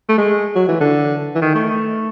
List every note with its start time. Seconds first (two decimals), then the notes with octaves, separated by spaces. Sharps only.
0.09 A3
0.18 G#3
0.56 F#3
0.69 E3
0.81 D3
1.35 E3
1.42 D#3
1.55 A3